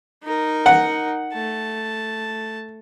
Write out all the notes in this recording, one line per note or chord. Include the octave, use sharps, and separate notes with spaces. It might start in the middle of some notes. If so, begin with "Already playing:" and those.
D#4 A#4
F#5
A3 A5